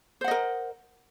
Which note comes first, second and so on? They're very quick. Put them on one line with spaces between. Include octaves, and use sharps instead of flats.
C5 F#5 D#5 A#4